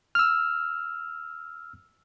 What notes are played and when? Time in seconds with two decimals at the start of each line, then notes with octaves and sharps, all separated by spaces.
0.15 E6 F6